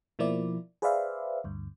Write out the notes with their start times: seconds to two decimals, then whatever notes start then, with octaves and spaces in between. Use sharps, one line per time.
0.19 B2 F3 A#3 E4 D5
0.82 G#4 B4 C5 D5 E5 F5
1.44 D2 G2